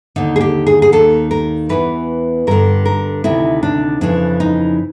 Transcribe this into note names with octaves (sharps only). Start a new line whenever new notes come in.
D#2 D3 D#4
G#4
G4
G#4
G#4
D#2 D#3 A4
A#4
E2 C3 E3 B4
G2 D3 A#4
A#4
D2 C3 D#3 E4
D4
F2 C#3 E3 D4
D#4